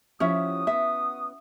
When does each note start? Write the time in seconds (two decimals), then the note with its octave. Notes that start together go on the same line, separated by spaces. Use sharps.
0.20 F3 C#4 E4 F#4 G4 E5 D#6
0.67 B3 C#4 E5